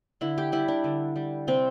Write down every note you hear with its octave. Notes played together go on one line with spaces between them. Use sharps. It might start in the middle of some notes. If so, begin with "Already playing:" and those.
D3 E4
G4
G3 E4
D4
D3
G3
C3 C4